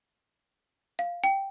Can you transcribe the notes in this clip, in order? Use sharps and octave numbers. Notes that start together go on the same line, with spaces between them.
F5
G5